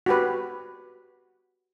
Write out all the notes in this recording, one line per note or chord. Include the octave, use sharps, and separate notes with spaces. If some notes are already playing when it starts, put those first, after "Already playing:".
F#4 G4 B4